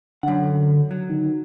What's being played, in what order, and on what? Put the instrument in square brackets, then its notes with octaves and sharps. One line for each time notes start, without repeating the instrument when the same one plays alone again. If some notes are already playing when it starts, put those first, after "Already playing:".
[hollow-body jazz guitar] F#2 F#5 [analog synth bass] D3
[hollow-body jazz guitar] F#3
[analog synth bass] D#3